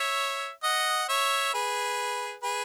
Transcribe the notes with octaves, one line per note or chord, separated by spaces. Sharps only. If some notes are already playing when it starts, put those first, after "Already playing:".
Already playing: C#5 E5
D#5 F#5
C#5 E5
G#4 B4
G#4 B4